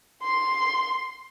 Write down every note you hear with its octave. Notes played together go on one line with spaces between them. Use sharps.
C6